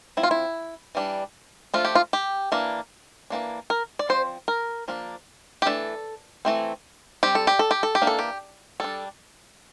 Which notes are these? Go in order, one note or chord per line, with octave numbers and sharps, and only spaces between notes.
F3 C4 E4
F4
E4
E3 G3 D4
F3 A3 D4 F4
G4
F4
G4
E3 A#3 D4
E3 G3 A#3 D4
A#4
D5
F3 C4 C5
A#4
F3 A#3 D4
G4
E3 A3 D4 A4
E3 A3 C4
G3 C4 G4
A4
G4
A4
G4
A4
G4
E3 A#3 D4
A4
G4
G3 D4 A4